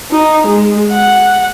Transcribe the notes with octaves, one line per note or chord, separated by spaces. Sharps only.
D#4
G#3
F#5